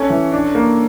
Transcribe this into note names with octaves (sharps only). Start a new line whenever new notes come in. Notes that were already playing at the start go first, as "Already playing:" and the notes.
Already playing: C#4 A4 C#5
E3
D4
A#3